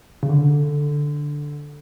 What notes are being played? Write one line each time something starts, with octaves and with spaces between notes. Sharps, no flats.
C#3
D3